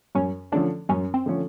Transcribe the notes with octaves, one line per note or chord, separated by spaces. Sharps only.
F#2 C#4
D3 F3 A3 C#4 D4
F#2 C#4
C4
D3 F3 A3 C#4